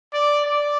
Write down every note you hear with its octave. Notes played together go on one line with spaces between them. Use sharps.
D5
D5